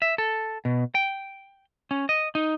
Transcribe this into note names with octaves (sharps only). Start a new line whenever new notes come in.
E5
A4
B2
G5
C#4
D#5
D#4